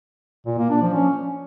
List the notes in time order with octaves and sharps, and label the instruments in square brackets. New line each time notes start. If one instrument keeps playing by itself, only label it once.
[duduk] A#2
A#3
D4
F3
C#4